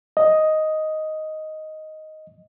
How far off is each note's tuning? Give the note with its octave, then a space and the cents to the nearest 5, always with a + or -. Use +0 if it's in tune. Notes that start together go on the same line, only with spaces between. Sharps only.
D#5 +5